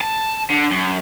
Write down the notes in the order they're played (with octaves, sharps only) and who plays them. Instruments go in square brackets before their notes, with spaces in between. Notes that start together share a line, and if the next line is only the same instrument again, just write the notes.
[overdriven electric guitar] A5
D3
F#2